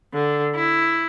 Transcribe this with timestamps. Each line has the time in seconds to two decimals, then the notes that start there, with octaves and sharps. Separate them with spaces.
0.14 D3
0.55 E4